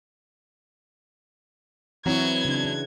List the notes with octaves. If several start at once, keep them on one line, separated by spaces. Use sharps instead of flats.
E3 F#3 C4 E4 G#6
C#3 D4